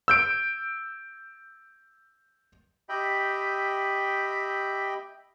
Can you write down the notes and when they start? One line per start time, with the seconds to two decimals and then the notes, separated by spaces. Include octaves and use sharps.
0.08 E6 G6 D7
2.89 G4 D#5 E5 G5 B5